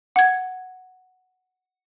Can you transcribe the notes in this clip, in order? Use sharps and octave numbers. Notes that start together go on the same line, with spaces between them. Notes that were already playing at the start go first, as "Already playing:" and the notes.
F#5 G#6